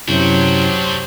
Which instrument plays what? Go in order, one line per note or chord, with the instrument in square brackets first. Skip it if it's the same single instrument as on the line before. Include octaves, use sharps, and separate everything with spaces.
[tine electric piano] F#2 C3 E4 [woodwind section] F#3 G4 C5 [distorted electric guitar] D4 F#4